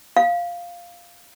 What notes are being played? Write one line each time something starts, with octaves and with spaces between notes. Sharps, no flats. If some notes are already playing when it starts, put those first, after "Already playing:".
F5